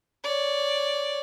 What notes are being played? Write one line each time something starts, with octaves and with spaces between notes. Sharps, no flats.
C#5 D5